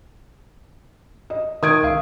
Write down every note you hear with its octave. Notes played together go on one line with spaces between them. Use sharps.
D#5
D#3 D#6 G#6 D7
C#2 E5 F5